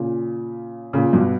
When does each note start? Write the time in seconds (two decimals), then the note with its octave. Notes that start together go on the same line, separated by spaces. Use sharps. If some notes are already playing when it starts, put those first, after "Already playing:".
Already playing: A#2 C#3
0.93 A#2 C#3
1.13 G2 B2